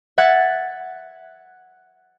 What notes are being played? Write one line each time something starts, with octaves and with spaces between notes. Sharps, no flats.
E5 F#5 F#6 G#6 A6